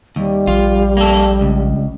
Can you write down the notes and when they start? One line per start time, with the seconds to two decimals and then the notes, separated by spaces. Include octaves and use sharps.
0.16 D#2 G3
0.47 A#1 F4
0.97 A#3 A4
1.41 C#2